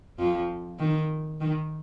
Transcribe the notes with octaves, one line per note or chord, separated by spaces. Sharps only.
F2 F3
D#3
D#3